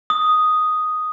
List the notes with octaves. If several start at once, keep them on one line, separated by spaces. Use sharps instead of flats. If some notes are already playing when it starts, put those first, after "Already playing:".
D#6